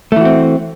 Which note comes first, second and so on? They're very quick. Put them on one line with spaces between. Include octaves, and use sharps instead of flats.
A3 E3 F#4 C4